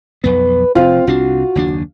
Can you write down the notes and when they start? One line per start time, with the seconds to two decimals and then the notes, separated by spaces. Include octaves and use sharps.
0.24 B1 F2 B3 B4
0.75 F1 C4 F4 F5
1.07 C2 C4 D4 F#4
1.55 F#1 D#2 D4